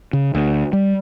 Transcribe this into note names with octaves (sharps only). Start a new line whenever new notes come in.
C#3
D2
G3